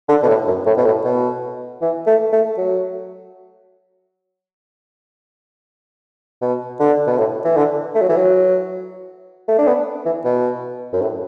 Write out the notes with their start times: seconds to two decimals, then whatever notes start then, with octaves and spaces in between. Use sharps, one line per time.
0.08 D3
0.23 B2
0.28 A2
0.47 F#2
0.66 A2
0.77 B2
0.85 A2
1.05 B2
1.82 E3
2.07 A3
2.33 A3
2.58 F#3
6.42 B2
6.80 D3
7.07 B2
7.18 A2
7.44 E3
7.57 D3
7.95 A3
8.02 F#3
8.09 E3
8.16 F#3
9.48 A3
9.58 D4
9.67 B3
10.06 E3
10.25 B2
10.93 F#2
11.02 A2